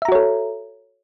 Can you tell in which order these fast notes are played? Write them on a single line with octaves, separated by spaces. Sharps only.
E5 A#5 F#4 C#5 A4